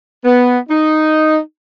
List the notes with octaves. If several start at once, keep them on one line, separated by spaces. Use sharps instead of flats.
B3
D#4